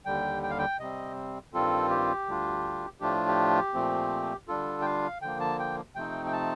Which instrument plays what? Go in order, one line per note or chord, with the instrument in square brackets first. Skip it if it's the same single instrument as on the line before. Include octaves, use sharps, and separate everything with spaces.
[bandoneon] D#2 D3 G3 G5
G5
F5
G5
C3 G3 C4 D#5
G2 D#3 G3 C4 F4 A4
G4
D2 D3 G3 D4 F4
A2 F3 A3 D4 F4 G4
G4
A#2 F3 A3 C4
D3 G3 D4 F4 A4
G5
F5
D3 F3 A#3 G5
A5
G5
C3 F3 A3 C4 D#4 G5
G5
A5